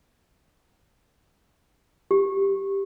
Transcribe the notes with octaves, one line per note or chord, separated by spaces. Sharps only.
G4